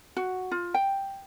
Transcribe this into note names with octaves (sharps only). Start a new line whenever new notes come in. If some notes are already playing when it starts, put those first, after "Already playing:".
F#4
F4
G5